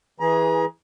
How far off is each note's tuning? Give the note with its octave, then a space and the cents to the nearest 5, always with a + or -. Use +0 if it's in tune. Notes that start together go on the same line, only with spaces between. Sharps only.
E3 -5 G#4 +0 A#5 +35